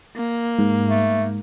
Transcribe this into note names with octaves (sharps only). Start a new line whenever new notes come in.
A#3
G#2
A3